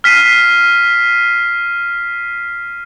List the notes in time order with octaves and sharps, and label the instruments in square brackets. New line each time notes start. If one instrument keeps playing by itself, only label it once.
[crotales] F6 B6 C7 D#7